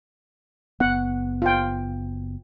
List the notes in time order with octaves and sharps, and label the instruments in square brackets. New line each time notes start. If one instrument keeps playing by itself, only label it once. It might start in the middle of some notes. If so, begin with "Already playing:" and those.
[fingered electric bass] F#1 B3 [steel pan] F#5
[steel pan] F4 G5